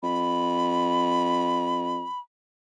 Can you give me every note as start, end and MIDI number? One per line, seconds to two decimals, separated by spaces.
0.03 2.05 41
0.03 2.19 83